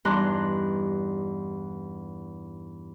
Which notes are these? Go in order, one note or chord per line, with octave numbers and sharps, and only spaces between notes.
E2 G2 D#4 A#5 C6 F#6